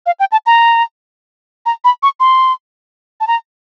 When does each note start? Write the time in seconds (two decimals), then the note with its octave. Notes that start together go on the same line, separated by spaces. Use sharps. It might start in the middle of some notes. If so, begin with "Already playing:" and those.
0.06 F5
0.20 G5
0.32 A5
0.46 A#5
1.66 A#5
1.84 B5
2.03 C#6
2.20 C6
3.20 A5
3.28 A#5